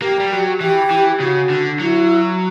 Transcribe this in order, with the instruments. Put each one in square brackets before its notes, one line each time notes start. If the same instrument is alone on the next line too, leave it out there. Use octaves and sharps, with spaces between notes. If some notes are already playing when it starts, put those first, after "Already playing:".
[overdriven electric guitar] A#3 [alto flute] G4
[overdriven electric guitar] G3
F#3
[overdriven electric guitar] E3 [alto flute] G4
[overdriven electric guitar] E3
[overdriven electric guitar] C#3 [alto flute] F#4
[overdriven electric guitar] D3
[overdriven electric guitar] F#3 [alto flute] E4